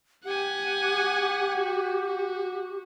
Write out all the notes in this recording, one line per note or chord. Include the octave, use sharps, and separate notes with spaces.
G4 F#5 G#5
F#4
F#4